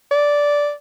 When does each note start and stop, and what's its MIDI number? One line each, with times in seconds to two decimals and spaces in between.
0.11 0.72 74